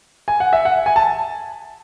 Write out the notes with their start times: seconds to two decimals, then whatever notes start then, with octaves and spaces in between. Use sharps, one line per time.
0.28 G#5
0.40 F#5
0.53 E5
0.65 F#5
0.86 G#5
0.96 A5